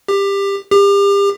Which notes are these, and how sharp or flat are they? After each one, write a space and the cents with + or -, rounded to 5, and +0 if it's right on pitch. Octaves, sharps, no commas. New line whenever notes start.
G4 +20
G4 +35